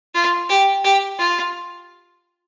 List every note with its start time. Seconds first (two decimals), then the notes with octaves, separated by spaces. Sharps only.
0.15 F4
0.49 G4
0.84 G4
1.19 F4